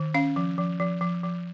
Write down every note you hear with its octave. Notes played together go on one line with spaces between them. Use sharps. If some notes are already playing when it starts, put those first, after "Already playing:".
Already playing: D#3
C#4 F5
F3
F3
F3
F3
F3